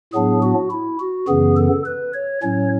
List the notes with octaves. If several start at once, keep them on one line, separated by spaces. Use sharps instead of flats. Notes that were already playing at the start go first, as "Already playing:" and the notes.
A2 F#3 B3 D4 G#4
F#4
E4
F#4
F#2 C#3 E3 B3 G#4
A4
B4
C#5
A2 F#3 C#4 C#5